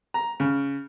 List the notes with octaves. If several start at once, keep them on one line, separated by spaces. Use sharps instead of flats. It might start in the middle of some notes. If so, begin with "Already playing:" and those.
A#5
C#3